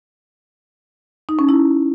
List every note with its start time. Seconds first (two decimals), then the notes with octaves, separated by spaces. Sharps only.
1.29 D#4
1.39 C#4
1.49 E4